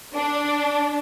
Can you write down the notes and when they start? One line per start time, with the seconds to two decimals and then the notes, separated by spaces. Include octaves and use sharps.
0.15 D4